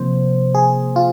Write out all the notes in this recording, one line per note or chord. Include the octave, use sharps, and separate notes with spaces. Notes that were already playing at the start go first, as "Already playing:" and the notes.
Already playing: C3 F3 A#3 C5
G#4
F4